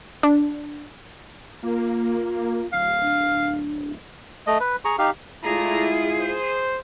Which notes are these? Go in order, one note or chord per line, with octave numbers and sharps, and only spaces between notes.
D4
A#3 F4
D1 F5
D4
A3 D#5
B4
G#4 A#5 C#6
D#4 G4 F5
G#3 A3 E4 F4 G#4 D5 A#5
C5